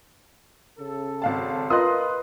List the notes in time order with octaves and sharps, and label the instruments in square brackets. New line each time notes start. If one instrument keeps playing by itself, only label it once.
[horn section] C#3 A4
[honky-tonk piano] G#1 F5 A5
[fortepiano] F4 D#5 [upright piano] A#4 C6 F#6 [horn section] B4 [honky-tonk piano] D#6